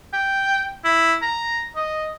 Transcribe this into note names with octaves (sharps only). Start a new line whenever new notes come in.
G5
E4
A#5
D#5